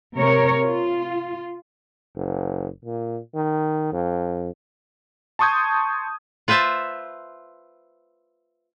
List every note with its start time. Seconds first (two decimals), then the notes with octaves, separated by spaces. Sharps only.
0.15 C3 A#4 C#5
0.64 F4
2.16 F#1
2.85 A#2
3.35 D#3
3.93 F2
5.39 A5 C6 C#6 D#6 G6 G#6
6.48 F4 B4 C5 E5 A5